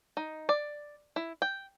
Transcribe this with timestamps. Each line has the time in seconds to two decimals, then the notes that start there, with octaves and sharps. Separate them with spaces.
0.17 D#4
0.49 D5
1.16 E4
1.42 G5